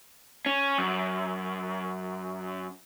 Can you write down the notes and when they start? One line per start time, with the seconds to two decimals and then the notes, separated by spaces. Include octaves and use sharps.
0.46 C#4
0.78 F#2